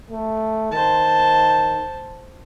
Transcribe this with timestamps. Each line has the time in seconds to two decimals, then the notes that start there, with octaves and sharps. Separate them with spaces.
0.10 A3
0.72 D#3 C5 A5